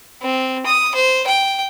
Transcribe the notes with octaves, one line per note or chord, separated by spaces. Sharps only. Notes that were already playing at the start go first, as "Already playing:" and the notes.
C4
D#6
C5
G5